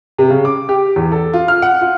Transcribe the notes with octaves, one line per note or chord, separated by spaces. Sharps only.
C3
C#3
D6
G4
E2
A4
F4
F6
F#5
F4